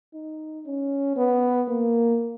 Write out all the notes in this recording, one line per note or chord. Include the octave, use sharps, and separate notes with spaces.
D#4
C#4
B3
A#3